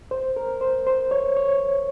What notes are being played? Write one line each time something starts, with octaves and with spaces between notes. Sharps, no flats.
C5
A#4
C5
C5
C#5
C#5